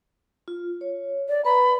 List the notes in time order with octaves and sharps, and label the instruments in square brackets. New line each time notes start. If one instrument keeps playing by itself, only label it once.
[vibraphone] F4
C#5
[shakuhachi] D5
[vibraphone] B4 A#5 [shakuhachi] B5